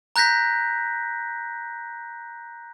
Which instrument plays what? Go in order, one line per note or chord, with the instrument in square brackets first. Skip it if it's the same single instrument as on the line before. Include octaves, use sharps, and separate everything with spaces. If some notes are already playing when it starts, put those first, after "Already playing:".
[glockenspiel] A#5 F#6 G6 A#6 B6